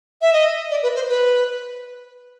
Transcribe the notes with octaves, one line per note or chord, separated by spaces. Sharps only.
E5
D#5
D5
B4
C5
B4